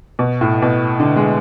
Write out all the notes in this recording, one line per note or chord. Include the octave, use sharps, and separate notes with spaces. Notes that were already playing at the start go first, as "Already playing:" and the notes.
B2
A2
B2
D3
G#3